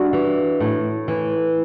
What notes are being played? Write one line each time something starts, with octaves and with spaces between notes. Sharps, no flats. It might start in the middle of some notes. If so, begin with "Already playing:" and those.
Already playing: G3 D4 F#4
E3
A2
E3